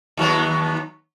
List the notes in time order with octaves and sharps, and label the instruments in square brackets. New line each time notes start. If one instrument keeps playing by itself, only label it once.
[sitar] D#2 F#3 B3